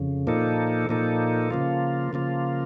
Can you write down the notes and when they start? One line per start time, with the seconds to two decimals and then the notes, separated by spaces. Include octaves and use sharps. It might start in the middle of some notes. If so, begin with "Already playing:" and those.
Already playing: F2 C#3
0.27 A#2 F3 A#3 D#4 A4
0.89 A#2 F3 A#3 D#4 A4
1.51 C#3 F3 A#3 F4
2.13 C#3 F3 A#3 F4